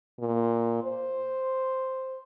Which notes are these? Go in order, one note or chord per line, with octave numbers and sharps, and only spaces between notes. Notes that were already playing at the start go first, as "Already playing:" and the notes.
A#2
C5